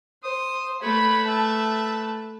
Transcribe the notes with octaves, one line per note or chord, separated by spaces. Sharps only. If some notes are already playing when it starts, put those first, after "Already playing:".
C5 D#6
A3 B4 C#5 B5
E5 A5